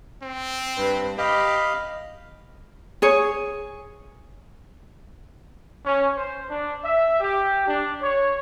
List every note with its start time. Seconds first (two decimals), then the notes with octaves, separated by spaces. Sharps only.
0.22 C4
0.77 G2 B4
1.18 G4 D#5 F5 B5
3.02 G#4 C#5
5.84 C#4
6.16 C5
6.48 D4
6.82 E5
7.20 G4
7.66 D4
8.00 C#5